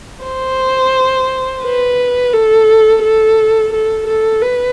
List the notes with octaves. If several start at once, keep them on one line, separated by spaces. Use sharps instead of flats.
C5
B4
A4
A4
A4
A4
B4